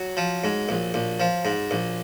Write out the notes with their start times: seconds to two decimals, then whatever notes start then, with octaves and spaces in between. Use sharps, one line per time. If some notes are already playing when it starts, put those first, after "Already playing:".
Already playing: F#3 F#4
0.17 F3
0.44 G#2
0.69 A#1
0.94 A#1
1.20 F3
1.45 G#2
1.71 A#1